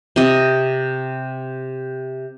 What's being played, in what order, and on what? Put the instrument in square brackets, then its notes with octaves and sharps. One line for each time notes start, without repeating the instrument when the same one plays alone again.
[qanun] C3 D#5